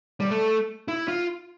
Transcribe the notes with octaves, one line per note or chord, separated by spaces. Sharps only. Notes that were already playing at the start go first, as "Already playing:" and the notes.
G3
A3
E4
F4